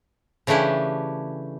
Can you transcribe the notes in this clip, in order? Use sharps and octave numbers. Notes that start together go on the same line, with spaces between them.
C#3 E3 A3 D4 E4 G4